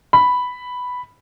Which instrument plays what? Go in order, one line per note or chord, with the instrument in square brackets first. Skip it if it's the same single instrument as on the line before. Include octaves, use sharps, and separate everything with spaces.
[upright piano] B5